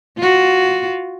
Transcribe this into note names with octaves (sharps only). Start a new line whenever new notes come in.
F4 F#4